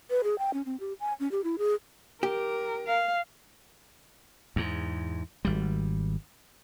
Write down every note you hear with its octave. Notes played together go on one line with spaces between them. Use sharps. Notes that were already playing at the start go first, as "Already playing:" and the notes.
B4
G#4
G5
C#4
C4
G4
G#5
C#4
G4
E4
G#4
G4 A#4
F5
E2 G#2
G#1 G3